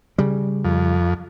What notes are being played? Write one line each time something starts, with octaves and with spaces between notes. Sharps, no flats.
C#3 G3
F2